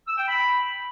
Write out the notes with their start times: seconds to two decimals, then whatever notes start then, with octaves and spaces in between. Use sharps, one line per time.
0.08 E6
0.18 G5
0.28 B5